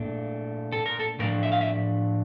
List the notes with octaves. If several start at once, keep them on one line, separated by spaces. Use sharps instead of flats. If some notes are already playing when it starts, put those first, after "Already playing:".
Already playing: A#2 A3 D4
A4
A#4
A4
A2 F3 A3 D4 A#4
E5
F5
E5